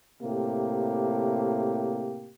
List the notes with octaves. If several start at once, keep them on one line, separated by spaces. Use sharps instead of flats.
A2 C3 A#3 G4